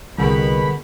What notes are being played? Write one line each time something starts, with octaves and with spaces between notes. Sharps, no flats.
C2 B2 D3 G#4 A#4 F#5 B5